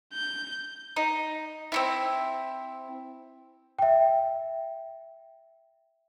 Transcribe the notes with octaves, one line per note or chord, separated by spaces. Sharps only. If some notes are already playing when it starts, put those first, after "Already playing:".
G6
D#4
C4 C#4 E4
E5 G5